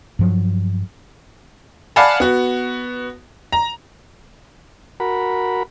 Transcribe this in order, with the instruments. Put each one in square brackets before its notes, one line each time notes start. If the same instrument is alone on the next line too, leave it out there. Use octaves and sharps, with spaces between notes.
[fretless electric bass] G2 F3 F#3
[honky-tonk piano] D5 F5 F#5 G#5 A5 B5
B3 F#4
A#5
[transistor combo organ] F#4 A#4 B5